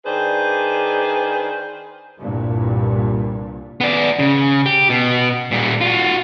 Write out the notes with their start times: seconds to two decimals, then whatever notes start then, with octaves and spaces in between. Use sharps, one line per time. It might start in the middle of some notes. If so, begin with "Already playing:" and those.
0.05 D#3 D4 G#4 B4 C5
2.20 C2 G2 A#2
3.81 B3 D5
4.19 C#3
4.66 G4
4.90 B2
5.51 A#2 G3
5.81 F4 F#4